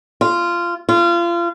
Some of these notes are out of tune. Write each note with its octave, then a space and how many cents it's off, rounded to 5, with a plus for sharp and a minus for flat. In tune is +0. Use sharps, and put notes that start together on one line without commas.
F4 -15
F4 -30